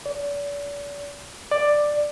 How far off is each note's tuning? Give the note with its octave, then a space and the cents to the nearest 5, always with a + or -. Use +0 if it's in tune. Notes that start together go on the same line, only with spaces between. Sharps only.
D5 -40
D5 +10